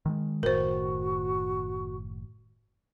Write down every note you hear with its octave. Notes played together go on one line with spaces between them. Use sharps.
D#3 F#3 G#3
F#1 A2 D#3 F#4 A#4 C5